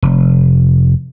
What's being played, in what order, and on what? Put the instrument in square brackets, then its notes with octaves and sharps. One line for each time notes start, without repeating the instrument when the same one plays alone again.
[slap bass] F1